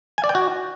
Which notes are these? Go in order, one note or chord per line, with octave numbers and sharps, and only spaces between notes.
G#5
D5
G5
F#4